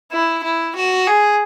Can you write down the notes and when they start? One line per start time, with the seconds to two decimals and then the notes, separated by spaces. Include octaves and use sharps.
0.12 E4
0.44 E4
0.76 F#4
1.07 G#4